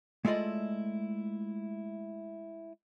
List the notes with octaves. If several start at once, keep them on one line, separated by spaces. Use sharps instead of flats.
G#3 A3 E4 F4 D5 D#5